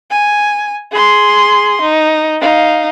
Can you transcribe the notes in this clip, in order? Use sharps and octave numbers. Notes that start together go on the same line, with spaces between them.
G#5
G#4 C6
D#4
D#4 F5